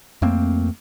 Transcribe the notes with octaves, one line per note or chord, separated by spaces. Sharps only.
F2 A3 A#3 C4